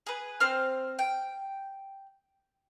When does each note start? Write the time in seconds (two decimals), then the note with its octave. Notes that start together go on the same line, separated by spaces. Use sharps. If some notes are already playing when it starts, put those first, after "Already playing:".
0.07 G#4 B4
0.40 C4 C5 F6
0.99 G5